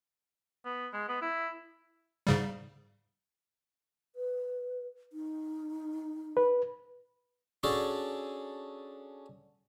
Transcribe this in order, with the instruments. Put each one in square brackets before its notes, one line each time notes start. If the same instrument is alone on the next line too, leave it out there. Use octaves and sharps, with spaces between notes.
[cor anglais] B3
G#3
B3
E4
[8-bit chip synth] G#2 C#3 G3
[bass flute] B4
D#4
[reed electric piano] B4
[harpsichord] C#4 D4 F#4 G#4 A4